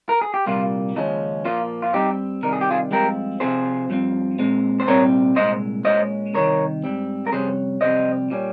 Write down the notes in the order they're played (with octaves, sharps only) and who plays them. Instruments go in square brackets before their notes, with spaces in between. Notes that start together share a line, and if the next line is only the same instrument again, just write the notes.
[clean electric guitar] A#4
G#4
G4
C2 A#2 G3 A#3 F4
D#2 C#3 F3 G#3 C#4 D#4
A#2 F3 A#3 F4
F4
G2 G3 C4 D#4 G4
C3 D#3 G3 A#4
G#4
G4
F4 G#4
G2 F3 G#3 C4 G4 A#4
C3 F3 C4 G#4 C5
G2 F3 C4
A#2 G#3 C4
C5
C2 A#2 G3 C4 A#4 C#5
C2 A#2 G#3 C5 D#5
A#2 G#3 C#4 C5 D#5
C2 C3 D#3 A#4 C#5
G#2 G3 C4
A#4
F2 C3 G3 C#4 G#4 C5
F2 C3 G3 C4 C5 D#5
A#2 G3 C#4